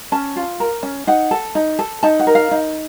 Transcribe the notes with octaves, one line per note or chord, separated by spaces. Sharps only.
C#4 A5
F4
A#4
C#4
D#4 F#5
A4
D#4
A4
D#4 A5
F#5
A#4
F5
D#4